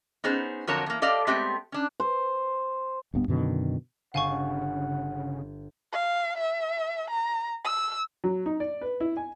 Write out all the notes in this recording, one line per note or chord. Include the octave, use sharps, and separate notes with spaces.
B3 C#4 D#4 G#4 C5
F2 D3 F#3 A#4 C#5 A5
E2 A#3
G4 A4 D5 D#5 F5
G#3 A3 B3 C4 G4
C#4 D4
C5
D1 G2 B3
F#2 B2 D3 D#3
G1 C#3 F5 F#5 G#5 C#6
F5
E5
A#5
E6
F#3
D#4
D5
B4
E4
G#5